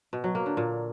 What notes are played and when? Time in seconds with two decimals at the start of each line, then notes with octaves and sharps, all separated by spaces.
0.13 B2
0.24 F#3
0.35 A#3
0.46 D3
0.57 A#2